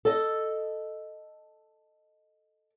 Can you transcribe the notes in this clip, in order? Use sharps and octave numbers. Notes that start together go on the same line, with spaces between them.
A4 D#5